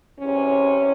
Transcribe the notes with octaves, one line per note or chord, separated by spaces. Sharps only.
E2 C3 C#4